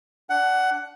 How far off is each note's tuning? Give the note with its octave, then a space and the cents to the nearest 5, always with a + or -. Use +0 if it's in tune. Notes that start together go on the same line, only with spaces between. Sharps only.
D4 -15 F#5 +15